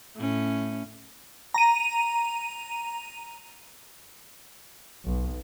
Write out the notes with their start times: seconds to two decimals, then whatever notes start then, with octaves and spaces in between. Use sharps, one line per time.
0.16 A2 C#4
1.54 A#5 D#7
5.05 B1